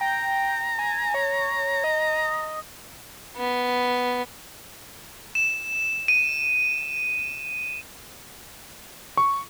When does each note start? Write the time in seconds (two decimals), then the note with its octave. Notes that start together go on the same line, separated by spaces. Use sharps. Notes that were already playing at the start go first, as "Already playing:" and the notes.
0.01 G5 A#5
0.79 G#5
1.14 C#5
1.84 D#5
3.36 B3
5.35 E7
6.08 D#7
9.17 C#6